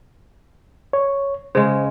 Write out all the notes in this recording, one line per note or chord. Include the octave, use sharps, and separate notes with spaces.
C#5
C#3 G#3 C5